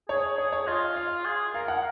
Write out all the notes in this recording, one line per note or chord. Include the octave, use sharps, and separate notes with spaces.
G#4 C#5
G#4 C#5
C#5
F4 D#5
F5
G#4
A#4 F5
F#5